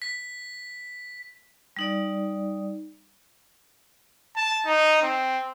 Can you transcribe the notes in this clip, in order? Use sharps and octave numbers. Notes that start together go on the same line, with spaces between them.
B6
G3 D#4 D5
A5
D#4
C4